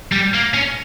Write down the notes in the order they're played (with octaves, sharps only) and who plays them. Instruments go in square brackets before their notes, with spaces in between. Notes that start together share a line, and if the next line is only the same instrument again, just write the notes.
[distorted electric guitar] G3
A#3
C#4